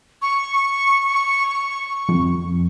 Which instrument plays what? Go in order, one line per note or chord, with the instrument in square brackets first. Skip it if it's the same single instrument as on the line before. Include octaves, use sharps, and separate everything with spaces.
[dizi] C#6
[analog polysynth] F2